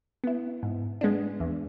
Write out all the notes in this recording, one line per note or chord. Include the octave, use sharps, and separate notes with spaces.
B3 E4
G#2
G#3 B3 D4
E2